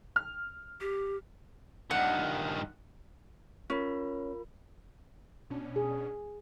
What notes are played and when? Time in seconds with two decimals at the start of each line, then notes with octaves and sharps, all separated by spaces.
0.16 F6
0.81 G4
1.91 G2 D#3 F#5
3.70 C#4 F4 A#4 B5
5.50 B2 C#4 D4
5.76 G#4